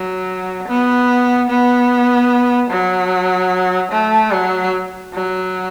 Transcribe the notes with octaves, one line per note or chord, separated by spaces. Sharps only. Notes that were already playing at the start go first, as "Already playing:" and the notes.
Already playing: F#3
B3
B3
F#3
A3
F#3
F#3